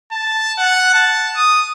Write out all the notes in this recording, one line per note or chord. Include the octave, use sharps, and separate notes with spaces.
A5
F#5
A5
D#6